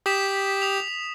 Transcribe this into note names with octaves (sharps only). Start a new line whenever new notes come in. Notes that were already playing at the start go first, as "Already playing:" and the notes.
G4 D#6 B6 E7
D#6 F7